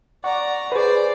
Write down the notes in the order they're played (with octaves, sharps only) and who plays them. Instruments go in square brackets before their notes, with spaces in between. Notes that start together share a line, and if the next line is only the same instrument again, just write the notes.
[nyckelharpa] D5 A#5 [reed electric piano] F#5 C#6
[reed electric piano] G#4 B4 [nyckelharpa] C5 D5